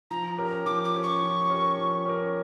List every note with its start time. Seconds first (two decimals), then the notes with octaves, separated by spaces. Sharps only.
0.11 F3 A#5
0.38 C#4 G4 A#4
0.66 F3 D6
0.84 D6
0.94 C#4 G4 A#4
1.03 C#6
1.22 F3
1.50 C#4 G4 A#4
1.78 F3
2.05 C#4 G4 A#4